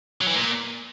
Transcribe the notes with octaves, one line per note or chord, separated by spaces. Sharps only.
F#3
E3
A#2